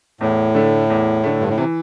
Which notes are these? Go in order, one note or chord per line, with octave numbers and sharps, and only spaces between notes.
E2 A2
D3 A3
E2
D3 A3
G2
A2
C3 E3